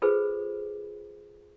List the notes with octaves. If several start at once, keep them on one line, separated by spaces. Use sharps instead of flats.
F4 G#4 A4 B4 C5